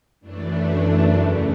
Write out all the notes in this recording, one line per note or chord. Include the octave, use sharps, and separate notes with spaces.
F#2 E3 A3 D4
E2 C#3 E3 A3